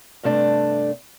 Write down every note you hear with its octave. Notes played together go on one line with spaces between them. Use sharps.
G2 C3 A3 D4